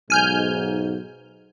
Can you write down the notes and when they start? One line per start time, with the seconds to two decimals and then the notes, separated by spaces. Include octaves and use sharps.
0.10 B1 G#2 G#5 F6 G6